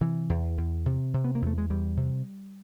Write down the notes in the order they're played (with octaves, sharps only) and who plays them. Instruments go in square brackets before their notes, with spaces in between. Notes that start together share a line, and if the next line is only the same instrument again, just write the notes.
[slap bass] C3 E3
E2
E2
C3
C3
B3
A#3
E2 A3
G#3
E2 G3
C3